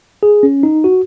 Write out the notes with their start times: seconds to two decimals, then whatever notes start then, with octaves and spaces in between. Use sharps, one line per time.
0.23 G#4
0.43 C#4
0.63 D#4
0.84 F#4